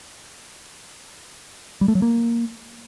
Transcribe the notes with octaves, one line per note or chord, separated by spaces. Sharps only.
G3
A3
F#3
A#3